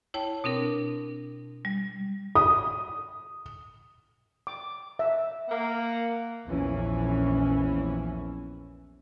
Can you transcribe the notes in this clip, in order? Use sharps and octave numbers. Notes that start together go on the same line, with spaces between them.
E4 C#5 G5 A5
B2 C4 D4 A#4
G3
D#6
D6
E5
A#3 F#5
A#1 E2 E3 C#4